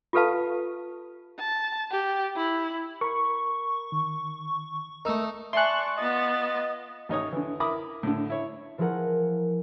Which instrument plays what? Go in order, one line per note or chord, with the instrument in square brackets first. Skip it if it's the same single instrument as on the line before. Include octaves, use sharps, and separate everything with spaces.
[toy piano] F4 G4 A4 B4 F5 A5
[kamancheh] A5
G4
E4
[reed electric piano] A#4 B5 [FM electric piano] C#6
[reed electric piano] D#3
[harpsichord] A3 D#4 [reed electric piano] A#4 E6
[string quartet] D5 A5 C#6 [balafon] E5 G#5 [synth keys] C6 F#6
[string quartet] B3 F4 A6 [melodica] D#5
[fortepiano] A1 D#4 C#5 D#6
D3 E3
E4 A#4 B5 D6 D#6
A2 D3
E4 C#5
[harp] E3 F3 E4 G#4 A#4 F#5